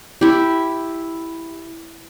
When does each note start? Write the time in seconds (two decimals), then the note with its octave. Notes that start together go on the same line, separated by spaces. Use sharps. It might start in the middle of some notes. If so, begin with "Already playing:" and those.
0.21 E4 G4